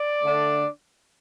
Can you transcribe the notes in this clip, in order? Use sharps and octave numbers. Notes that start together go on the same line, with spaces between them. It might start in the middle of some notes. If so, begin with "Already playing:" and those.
Already playing: D5
D3 A3 D4